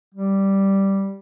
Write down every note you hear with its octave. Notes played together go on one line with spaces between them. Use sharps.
G3